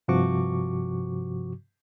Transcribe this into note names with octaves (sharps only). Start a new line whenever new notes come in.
G2 C3 F3 F#4 C#6 D6